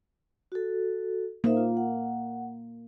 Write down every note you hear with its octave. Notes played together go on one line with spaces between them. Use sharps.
F#4 A4
A#3 D#4 C5 E5
F4
F#5